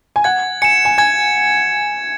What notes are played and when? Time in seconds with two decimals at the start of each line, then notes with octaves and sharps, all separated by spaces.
0.16 G#5
0.24 F#5 G#6
0.62 G#5 C#7 E7
0.85 G#5
0.98 G#5 G#6